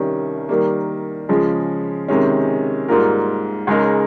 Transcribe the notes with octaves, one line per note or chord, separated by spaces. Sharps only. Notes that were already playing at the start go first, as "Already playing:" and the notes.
Already playing: C2 C3 D#3 G3 C#4
D#3 G3 A#3
C#3 F3 G#3
C3 D#3 G#3 C#4
G#2 G3 A#3 F4 A#4
C#2 C#3 G#3 D#4 A#4